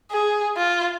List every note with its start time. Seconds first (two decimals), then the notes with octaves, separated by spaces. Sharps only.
0.11 G#4
0.57 F4